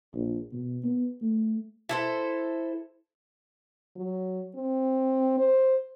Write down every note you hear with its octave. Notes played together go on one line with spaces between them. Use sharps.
A#1
B2
B3
A3
E4 A4 C5
F#3
C4
C5